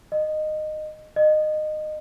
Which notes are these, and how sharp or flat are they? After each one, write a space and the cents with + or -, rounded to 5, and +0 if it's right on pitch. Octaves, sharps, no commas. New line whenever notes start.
D#5 -15
D#5 -20